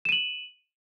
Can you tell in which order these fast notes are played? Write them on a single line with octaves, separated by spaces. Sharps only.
E7 D#7 F#7